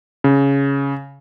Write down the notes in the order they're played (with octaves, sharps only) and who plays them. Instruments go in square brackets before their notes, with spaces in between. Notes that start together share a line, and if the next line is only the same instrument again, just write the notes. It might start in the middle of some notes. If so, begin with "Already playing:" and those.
[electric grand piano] C#3